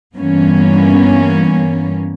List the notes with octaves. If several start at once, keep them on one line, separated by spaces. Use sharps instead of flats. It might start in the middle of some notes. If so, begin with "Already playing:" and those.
G2 E3 A#3 B3 C#4